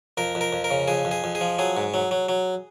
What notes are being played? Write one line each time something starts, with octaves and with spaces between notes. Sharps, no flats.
F2 A#4
F2
A#4
F2
A#4
C#3
F2 G#4
F2
G#4
F2
G#4
F3
F#3 G#4
G#2
F#3
F#3
F#3